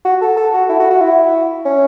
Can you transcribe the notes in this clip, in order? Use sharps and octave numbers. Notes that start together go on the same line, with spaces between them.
F#4
A4
A4
F#4
E4
F#4
F#4
E4
C#4